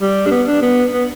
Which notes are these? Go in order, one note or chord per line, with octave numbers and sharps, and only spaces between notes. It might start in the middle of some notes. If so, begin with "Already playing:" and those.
G3
D4
B3
D4
B3
B3